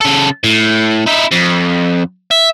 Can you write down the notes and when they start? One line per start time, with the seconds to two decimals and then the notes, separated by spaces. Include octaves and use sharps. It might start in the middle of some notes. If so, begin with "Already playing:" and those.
0.01 C#3 A4
0.44 A2
1.06 D#4 E4
1.31 F2
2.31 E5